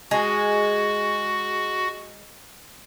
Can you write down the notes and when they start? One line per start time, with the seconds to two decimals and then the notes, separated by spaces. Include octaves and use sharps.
0.11 G#3 F#4